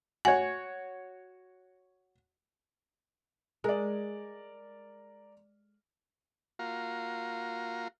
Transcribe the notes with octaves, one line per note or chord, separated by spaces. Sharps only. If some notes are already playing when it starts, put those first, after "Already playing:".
F#4 C#5 G#5
G#3 A#4 D5
A#3 F4 F#4 F5 A#5